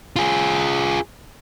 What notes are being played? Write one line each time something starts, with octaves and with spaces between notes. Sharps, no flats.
F4 G#4